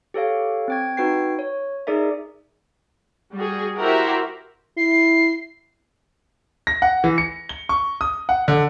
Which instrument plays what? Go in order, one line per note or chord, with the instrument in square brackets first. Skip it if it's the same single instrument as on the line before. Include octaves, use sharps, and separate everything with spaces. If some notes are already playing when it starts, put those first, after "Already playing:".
[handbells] G4 A4 C#5 F5
C4 G5 G#6
D#4 F#4 B4 G5 G#6 C7
C#5
D#4 G#4 A#4 D5 E5
[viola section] G3 F#4 G#4
E4 F#4 G4 A#4 C5 E5
[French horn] E4 [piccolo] C7
[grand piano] A#6
F#5
E3
C#7
G7
C#6
D#6
F#5
D3